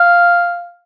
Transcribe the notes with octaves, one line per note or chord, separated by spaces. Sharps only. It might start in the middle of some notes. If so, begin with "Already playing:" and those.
Already playing: F5